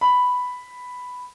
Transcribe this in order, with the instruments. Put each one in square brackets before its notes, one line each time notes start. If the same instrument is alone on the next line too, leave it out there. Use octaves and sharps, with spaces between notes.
[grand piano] B5